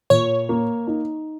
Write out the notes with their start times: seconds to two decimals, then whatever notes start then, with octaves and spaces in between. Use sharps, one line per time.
0.10 A#2 C#5
0.49 A#3
0.87 D#4